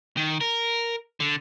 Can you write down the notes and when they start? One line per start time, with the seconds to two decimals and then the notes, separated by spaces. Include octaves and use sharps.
0.17 D#3
0.41 A#4
1.20 D3